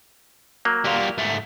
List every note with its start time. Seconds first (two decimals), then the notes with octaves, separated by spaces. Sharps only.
0.65 F#3 A#3
0.84 G3 F4
1.18 G#2 A3